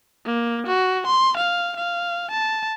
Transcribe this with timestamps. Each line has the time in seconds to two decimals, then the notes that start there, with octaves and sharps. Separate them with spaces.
0.25 A#3
0.67 F#4
1.07 C6
1.37 F5
1.76 F5
2.31 A5